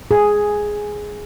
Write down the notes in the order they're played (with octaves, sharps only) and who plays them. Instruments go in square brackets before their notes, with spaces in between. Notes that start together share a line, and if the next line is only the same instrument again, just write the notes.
[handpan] G#4